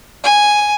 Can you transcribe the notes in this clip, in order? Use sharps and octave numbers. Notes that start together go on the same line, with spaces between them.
G#5